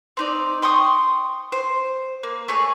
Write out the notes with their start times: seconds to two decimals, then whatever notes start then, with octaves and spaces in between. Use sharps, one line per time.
0.17 C4 D#4 D5
0.62 G5 C6 C#6 D#6
1.52 C5
2.23 A#3
2.48 A3 G#4 C#5